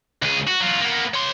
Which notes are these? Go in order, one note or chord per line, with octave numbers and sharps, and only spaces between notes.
C#2 G#4
F#4
F#3 F4
A#3 B3
C#5 C6